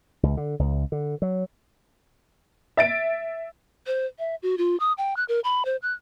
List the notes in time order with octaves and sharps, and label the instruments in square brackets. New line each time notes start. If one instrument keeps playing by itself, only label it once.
[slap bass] C#2
D3
C#2
D3
F#3
[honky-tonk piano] E5 A6 D7
[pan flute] C5
E5
F#4
F4
D#6
G5
F#6
A#4
B5
C5
F#6